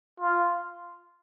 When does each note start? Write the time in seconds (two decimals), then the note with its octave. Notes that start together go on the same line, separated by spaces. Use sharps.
0.20 F4